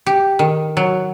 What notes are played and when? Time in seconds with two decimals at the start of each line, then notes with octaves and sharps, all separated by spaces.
0.06 G4
0.39 D#3
0.77 F#3